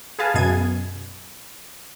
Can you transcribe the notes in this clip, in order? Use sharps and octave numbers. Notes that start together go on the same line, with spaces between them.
G#4 B4 F5 G#5 A5
F#2 B2 G#4 G#6 D#7